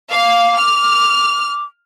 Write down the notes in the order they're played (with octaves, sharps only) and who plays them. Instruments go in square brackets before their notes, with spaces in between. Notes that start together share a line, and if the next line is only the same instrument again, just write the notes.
[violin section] F5 [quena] D6
[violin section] F6